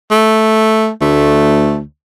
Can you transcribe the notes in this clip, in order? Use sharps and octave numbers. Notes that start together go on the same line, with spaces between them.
A3
D2 A3